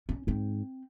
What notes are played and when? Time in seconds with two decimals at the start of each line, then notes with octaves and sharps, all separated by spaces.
0.09 C#4
0.27 G#2 C4